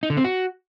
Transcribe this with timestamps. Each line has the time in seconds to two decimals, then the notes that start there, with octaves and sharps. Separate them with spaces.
0.03 D#4
0.10 D3
0.17 C4
0.24 F#4